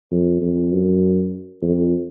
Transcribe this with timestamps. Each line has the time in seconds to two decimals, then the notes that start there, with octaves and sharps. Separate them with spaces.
0.11 F2
0.41 F2
0.72 F#2
1.62 F2